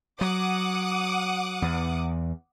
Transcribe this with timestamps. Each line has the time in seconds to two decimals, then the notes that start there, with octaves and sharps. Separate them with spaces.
0.21 F#3 F#5 D6 D#6
1.62 E2